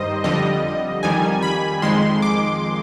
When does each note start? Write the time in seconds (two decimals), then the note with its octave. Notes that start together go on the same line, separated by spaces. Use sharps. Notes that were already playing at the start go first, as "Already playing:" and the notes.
Already playing: G2 D#3 G3 C5 D#5
0.24 F2 D3 G3 D#5
1.03 F2 D#3 G3 G#5
1.42 B5
1.82 F2 D#3 G#3 C6
2.22 D6